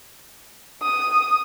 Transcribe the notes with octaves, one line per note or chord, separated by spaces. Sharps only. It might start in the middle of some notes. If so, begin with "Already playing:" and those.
D#6